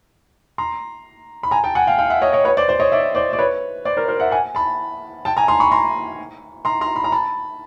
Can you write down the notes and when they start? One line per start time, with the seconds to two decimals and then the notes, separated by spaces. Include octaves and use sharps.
0.58 A#5 C6
1.43 B5
1.51 G#5 A#5
1.64 G5 A5
1.75 F#5 G#5
1.87 F5 G5
1.98 F5 G5
2.10 E5 F#5
2.22 C#5 D#5
2.33 C#5 D#5
2.45 B4 C#5
2.57 C5 D5
2.68 C5 D5
2.80 C#5 D#5
2.92 D5 E5
3.15 C5 D5
3.33 D5
3.39 B4 C#5
3.85 C5 D5
3.97 A#4 C5
4.08 A#4 C5
4.20 E5 F#5
4.31 F#5 G#5
4.55 A5 B5
5.25 G5 A5
5.37 G#5 A#5
5.48 A#5 C6
5.60 B5 C#6
5.72 A#5 C6
6.65 A#5 C6
6.81 A#5 C6
6.96 B5
7.04 A#5
7.12 A5 B5